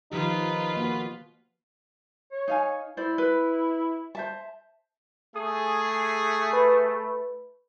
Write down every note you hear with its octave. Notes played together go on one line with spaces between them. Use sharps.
D#3 F3 D#4 F4 G4 B4
B2 A#3
C#5
D#4 F5 G#5
E4 C5 D5
B4
C5 E5 A5
A3 G#4 D#6
B4